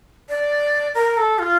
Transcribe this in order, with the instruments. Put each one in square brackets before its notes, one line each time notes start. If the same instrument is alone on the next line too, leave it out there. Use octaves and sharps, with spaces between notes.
[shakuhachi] D5
A#4
A4
F4